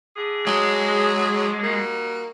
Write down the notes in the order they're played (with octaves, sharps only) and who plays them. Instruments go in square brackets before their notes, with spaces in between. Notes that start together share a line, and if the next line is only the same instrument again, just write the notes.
[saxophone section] D3 G#4
[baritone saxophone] F#3 [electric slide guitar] G#3
[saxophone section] G3 D#4 F#4 [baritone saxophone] A#3